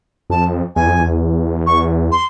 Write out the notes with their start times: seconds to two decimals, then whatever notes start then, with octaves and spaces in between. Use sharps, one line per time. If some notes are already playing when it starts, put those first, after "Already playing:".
0.30 F2 A5
0.76 E2 G#5
0.87 F2
0.99 E2
1.67 C#6
2.12 C6